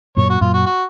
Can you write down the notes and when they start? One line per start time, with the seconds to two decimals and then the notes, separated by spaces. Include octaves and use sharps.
0.17 F#2 A#2 C#5
0.30 F#4
0.41 F#2 A#2 F4
0.54 F#4
0.66 F#4